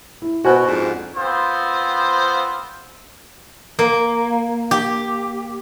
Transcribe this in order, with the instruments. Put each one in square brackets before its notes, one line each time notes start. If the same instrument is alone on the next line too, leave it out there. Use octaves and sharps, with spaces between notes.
[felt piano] E4
[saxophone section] B2 [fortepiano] F#4 [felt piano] C5 G#5 F#6
[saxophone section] F2 G#2 D4
[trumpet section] B3 C4 F4 C5
[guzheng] A#3
G4